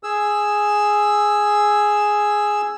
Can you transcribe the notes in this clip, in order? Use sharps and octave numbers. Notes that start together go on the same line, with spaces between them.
G#4 E6